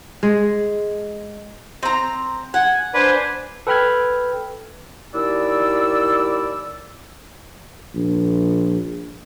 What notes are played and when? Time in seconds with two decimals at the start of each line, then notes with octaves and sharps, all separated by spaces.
0.23 G#3
1.83 C4 A#5
2.54 F#5 G#5
2.94 D4 B4 C5 G#5
3.67 A4 B4 G5 B5 F6 G#6
5.14 D#2 E4 D5 E6
7.95 A#1